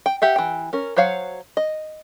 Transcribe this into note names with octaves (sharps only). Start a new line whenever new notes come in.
G5
G4 E5 F#5
E3 G5
C#4 A#4
F#3 C5 C#5 F5 F#5
D#5